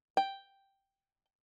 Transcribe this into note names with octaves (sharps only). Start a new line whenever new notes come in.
G5